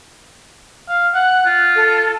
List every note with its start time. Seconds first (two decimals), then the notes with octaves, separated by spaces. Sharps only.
0.88 F5
1.14 F#5 F#6
1.45 F4
1.76 A4